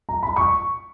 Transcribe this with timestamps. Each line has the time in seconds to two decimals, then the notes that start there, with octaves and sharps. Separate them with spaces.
0.09 A#5
0.23 B5
0.36 C#6